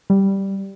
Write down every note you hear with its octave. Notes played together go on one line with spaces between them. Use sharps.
G3